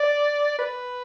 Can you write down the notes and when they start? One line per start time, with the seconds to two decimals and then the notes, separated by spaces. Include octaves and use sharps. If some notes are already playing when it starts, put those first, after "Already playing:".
Already playing: D5
0.58 B4